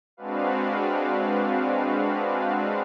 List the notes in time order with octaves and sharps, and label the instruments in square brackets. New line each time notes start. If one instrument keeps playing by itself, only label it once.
[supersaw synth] G#3 C4 D4 F#4 B4 F5